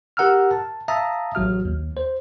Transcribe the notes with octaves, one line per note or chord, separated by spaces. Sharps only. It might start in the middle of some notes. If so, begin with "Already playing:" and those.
G4 A#4 F#5 A#5 E6 F6
A5
E5 F5 A5 A#5 D#6
A1 F#3 F#4 F6
D#2
C5